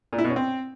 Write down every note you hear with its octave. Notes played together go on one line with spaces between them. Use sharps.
A#2
E4
B2
C#4
C4